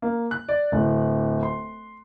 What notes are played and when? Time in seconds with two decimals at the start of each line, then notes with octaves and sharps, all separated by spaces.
0.02 A#3
0.31 F#6
0.49 D5
0.72 D1
1.43 C6